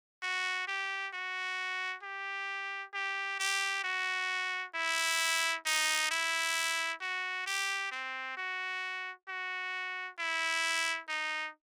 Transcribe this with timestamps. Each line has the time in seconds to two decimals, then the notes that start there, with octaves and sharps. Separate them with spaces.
0.23 F#4
0.68 G4
1.14 F#4
2.03 G4
2.94 G4
3.40 G4
3.84 F#4
4.75 E4
5.66 D#4
6.11 E4
7.01 F#4
7.46 G4
7.92 C4
8.37 F#4
9.28 F#4
10.19 E4
11.09 D#4